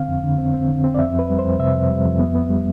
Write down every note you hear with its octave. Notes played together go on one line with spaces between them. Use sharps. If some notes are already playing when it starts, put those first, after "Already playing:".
Already playing: D3 C4 F5
F2
D3
C4
C4
D3
C4
D5
F2 E5
F2 B4
G3
C5
F2
C3 E5
F2
G3
F2
B3
B3
G3